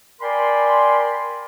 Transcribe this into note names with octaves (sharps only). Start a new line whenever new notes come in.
A#4 D5 G5 G#5 B5 C6